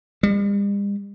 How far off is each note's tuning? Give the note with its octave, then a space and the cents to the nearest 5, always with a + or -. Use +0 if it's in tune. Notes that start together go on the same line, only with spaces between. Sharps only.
G3 +45